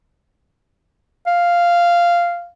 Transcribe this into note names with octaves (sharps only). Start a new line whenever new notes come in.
F5